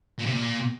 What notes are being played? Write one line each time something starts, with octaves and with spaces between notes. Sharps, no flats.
A#2
C3
A#2